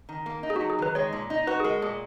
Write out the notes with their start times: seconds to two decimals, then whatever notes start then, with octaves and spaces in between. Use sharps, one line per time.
0.09 D#3
0.26 A#3
0.43 D#4
0.50 G#4
0.56 F#4
0.61 F#3
0.70 G#4
0.79 D#3 B4
0.95 G#3 C#5
1.13 A#2
1.30 D#4
1.47 F#4 B4
1.60 G#4
1.64 G#3 A#4
1.82 A#2 G#4